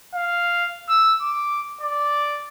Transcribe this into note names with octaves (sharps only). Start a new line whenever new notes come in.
F5
E6
D6
D5